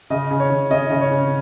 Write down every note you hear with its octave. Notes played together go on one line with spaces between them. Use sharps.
C#3 D#5
C#3
C#5
C#3
C#4 D#5
C#3 D#5
C#5
C#3